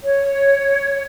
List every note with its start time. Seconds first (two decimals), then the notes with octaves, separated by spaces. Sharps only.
0.02 C#5